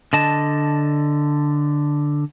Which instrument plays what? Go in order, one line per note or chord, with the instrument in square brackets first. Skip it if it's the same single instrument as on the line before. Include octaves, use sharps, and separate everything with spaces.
[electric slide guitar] D3 D#5 A5